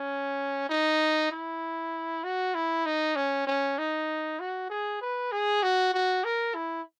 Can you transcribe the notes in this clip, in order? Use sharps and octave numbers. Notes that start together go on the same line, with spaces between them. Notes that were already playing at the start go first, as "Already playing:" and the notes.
Already playing: C#4
D#4
E4
F#4
E4
D#4
C#4
C#4
D#4
F#4
G#4
B4
G#4
F#4
F#4
A#4
E4